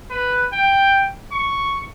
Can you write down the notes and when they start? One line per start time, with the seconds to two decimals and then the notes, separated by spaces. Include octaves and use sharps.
0.11 B4
0.54 G5
1.33 C#6